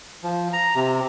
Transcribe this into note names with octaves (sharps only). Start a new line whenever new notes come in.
F3
A#5
C3